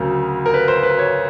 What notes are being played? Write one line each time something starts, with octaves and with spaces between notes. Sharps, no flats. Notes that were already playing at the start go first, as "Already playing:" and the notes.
Already playing: D2 C#3 F#3 A#4
A#4
B4
C5
B4
C#5